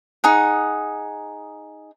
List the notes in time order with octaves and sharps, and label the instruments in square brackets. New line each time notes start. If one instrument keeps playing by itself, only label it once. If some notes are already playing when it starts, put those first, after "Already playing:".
[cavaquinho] D#4 G#4 F#5